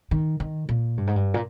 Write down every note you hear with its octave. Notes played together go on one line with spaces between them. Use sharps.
D#3
D#3
A#2
G2
G#2
G2
A#2